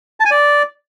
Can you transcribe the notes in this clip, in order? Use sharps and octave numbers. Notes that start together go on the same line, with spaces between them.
A5
G#5
D5